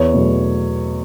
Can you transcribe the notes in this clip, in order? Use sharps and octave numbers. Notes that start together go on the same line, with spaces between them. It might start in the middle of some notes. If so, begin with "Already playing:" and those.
Already playing: E2 C#5
B2 F#3 A3